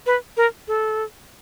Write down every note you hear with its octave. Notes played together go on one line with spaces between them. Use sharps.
B4
A#4
A4